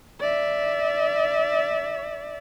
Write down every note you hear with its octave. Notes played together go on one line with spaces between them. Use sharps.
D5 E5